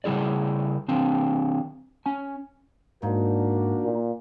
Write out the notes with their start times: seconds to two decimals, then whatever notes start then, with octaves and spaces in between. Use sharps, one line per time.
0.04 C#3 G3 E4 G#4 D5
0.88 D#3 C4 D4
2.06 C#4 G#5
3.03 G#2 A#3 D4 D#4 F#4 A#4
3.85 A#2